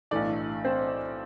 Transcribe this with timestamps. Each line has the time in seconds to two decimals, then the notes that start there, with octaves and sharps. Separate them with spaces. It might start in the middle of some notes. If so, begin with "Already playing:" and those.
0.11 B1 A2 E3 A3 D4 D5
0.65 C4 C5